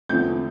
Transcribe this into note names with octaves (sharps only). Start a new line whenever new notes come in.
E2 D3 F3 A3 C4 G6